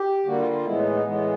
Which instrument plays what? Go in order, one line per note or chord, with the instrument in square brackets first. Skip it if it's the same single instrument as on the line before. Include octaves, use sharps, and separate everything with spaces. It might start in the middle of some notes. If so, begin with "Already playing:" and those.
Already playing: [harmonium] G4
D3 G3 A#3 F#4
F4
F4
A2 E3 G#3 B3 E4
D#4
D#4
A2 E3 G#3 B3